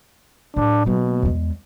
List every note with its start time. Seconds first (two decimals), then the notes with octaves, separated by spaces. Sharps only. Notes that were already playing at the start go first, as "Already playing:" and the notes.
0.56 A2 D4
0.86 B2 F#3 A#3
1.22 E2 G#3